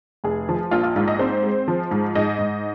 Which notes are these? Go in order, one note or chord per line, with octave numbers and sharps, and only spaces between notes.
F1 G#4
F3
A#1 F4
F4
G#2 F4
D#5
C4 C5
G#3
F3
G#2
G#2 D#5
G#2